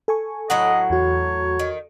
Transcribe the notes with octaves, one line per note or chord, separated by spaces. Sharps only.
A4 G#5 C#6
A2 F#3 D#5 F#5
E2 F#4 C#5
D#3